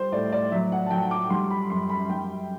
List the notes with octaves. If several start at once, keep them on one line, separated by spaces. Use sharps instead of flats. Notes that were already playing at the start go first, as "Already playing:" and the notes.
Already playing: G3 C5
A2 D5
D5
F#3 E5
F#5
A5
F#3 G5
D6
G3 C6
B5
F#2 C6
B5
G3 G5